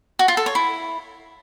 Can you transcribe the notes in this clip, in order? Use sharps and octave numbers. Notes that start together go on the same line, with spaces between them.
F#4
F4
A4
C#5
E4